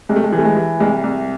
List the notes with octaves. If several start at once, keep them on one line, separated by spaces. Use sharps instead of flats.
C2 G#3
A3
G#3
E3
A3
G#3
E3
C2 G#3
C2